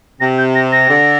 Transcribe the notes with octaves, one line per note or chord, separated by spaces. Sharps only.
C3 A#6
G6
A#6
A#6
D3